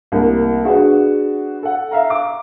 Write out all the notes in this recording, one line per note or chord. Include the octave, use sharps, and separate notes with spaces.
C2 A2 A#3
B3 D4 F#4 G#4
A4 F#5
E5 F5 A#5
D6